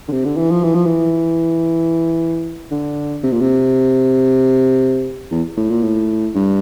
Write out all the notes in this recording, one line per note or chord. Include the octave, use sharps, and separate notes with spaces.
D3
C3
D3
E3
F3
E3
F3
E3
D3
C3
A#2
C3
E2
A2
A#2
A2
G2